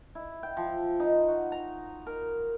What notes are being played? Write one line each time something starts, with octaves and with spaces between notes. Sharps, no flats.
E4
G5
F3
D#4
F#4
A#5
A#4